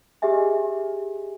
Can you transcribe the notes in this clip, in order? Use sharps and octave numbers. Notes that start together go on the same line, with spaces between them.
G4 G#4 D#5 E5 G#5